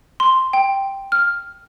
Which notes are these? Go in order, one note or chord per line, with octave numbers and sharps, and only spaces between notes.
C6
G5
F6